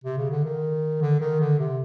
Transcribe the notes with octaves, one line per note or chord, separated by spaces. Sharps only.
C3
C#3
D3
D#3
D3
D#3
D3
C3